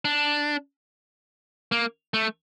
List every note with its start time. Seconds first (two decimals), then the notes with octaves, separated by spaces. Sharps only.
0.05 D4
1.72 A#3
2.14 A3